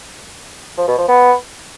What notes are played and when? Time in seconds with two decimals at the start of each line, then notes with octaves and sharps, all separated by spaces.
0.78 F3
0.88 B2
0.98 F3
1.08 B3